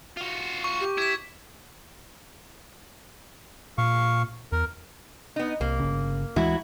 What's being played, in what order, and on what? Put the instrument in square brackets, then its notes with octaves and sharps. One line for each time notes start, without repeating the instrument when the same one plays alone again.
[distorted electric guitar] F4 F#4
[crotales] C#6
[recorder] G4
[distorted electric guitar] E4 [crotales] G#6 B6
[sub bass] A#2 [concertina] F5 C#6
[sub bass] E2 [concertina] A#4
[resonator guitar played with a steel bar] B3 D#4
[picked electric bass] C2 [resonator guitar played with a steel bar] A#3
[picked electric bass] G1 C#3
[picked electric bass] D2 E3 G#3 [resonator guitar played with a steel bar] F#3 E4 F#4